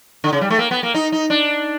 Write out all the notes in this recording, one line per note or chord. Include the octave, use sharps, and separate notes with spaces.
D3
C#3
G3
A3
A#3
B3
A#3
D#4
D#4
D4